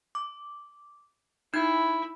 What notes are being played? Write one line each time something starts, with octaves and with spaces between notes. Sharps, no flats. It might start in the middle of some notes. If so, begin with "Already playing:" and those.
D6
D#4 E4 G6 G#6